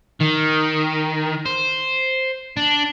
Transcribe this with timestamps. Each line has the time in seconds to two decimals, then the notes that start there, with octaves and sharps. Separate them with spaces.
0.21 D#3
1.45 C5
2.57 D4